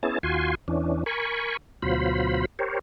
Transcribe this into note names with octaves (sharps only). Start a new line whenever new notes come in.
B3 C#4 E4 G#4 A5
D#2 F4 F#4 G#5 C6
E2 E3 C#4 D4
A#4 G#5 B5 C#6
D2 B2 F#3 F4 C5 B5
G4 A#4 C5 C#5